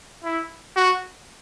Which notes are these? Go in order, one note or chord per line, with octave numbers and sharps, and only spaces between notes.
E4
F#4